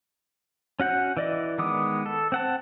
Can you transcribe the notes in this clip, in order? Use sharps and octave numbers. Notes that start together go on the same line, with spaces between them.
C#4 F#4 F#5 G6
E3 D5 D#5
D#3 G#3 B3 D6 D#6
A4
C4 F#5 A5